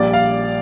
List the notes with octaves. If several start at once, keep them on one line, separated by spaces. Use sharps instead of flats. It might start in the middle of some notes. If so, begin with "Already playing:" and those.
Already playing: A#1 A#2 G3 D5
F5